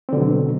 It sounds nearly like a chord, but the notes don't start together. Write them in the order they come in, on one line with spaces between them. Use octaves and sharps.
C4 D3 B2 F#3